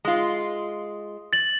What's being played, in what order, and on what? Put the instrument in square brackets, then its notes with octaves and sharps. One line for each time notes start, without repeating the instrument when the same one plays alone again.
[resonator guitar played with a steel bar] G#3 F4
[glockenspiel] A6 F#7